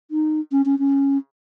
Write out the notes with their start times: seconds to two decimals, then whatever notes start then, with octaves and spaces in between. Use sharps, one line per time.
0.11 D#4
0.52 C#4
0.66 C#4
0.79 C#4